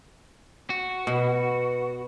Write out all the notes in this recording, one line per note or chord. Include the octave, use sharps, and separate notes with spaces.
F#4
B2 B4